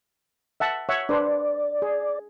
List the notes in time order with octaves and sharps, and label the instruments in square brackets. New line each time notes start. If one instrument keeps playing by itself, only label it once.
[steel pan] E5 F#5 A5
C#5 E5 F#5
[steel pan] D4 B4 C5 [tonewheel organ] D5
[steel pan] G#4